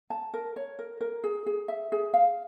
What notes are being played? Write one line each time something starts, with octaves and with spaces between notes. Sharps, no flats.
A5
A#4
C#5
A#4
A#4
G#4
G#4
E5
G#4
F5